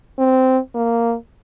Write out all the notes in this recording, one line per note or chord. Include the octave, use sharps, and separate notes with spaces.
C4
A#3